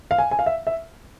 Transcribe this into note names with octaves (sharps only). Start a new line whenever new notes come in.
F5
G#5
G#5
F5
E5
E5